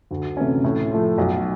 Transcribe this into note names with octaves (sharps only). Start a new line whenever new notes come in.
D2
C3 E3 A3 C#4
A2
F3 A3
B1